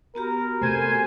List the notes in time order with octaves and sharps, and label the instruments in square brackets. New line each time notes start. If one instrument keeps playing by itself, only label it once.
[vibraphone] B3 F#4 G4 [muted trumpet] A#4
[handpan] C3 A3 [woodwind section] C5 G#5